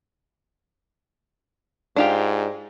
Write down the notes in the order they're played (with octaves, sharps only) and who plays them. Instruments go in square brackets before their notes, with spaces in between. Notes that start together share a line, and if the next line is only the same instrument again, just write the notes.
[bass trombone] G#2 [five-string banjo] D4 F4 G4